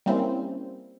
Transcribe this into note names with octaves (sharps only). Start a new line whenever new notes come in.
G3 A#3 C4 C#4 E4